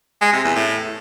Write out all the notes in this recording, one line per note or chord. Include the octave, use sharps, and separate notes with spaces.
G#3
C3
E2
A2